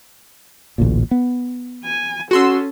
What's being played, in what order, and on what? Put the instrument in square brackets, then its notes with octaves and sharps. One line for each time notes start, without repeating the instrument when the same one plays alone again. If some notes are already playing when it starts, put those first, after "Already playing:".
[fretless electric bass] A1 D2 A#2
B3
[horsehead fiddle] G#5
[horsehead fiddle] C#4 A4 [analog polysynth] F#4 C6 E6